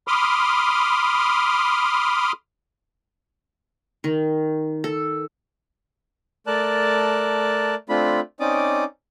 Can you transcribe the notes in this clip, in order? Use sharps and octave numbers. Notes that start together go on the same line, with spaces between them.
B5 C6 D6 D#6 F6
D#3
A4
A3 A#4 D5 A5 F#6
A3 C4 D4 F4 B5
C4 C#4 D#4 D5 D6 D#6